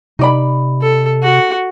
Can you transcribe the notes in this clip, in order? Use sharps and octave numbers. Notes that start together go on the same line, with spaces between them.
C3 D#4 D5 B5
A4
F#4